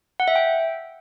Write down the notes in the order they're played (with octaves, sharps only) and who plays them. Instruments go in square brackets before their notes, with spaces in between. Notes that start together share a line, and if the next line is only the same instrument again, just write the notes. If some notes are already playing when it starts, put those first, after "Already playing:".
[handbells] F#5
E5
G5